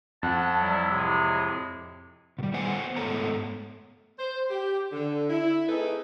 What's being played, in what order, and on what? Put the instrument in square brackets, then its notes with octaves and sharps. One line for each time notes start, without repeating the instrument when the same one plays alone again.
[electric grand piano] F2 [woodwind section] F#5 A5
[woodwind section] F#3 G3 E4
A2 C3 G#3
[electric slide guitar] B2 G3
B3 C5 F#5 G#5
G#2 A3 B3 A4 C#5 A#5
[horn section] C5
G4
D3
E4
A3 C4 D#4 G#4 A4 B4